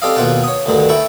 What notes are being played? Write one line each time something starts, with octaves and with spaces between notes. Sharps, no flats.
C4 G4 A4 D5 D#5 F5
D#2 B2 F4 F#5 G5 A5
C#5 D#6
D2 G2 D3 D#3
E4 G5 A5 C#6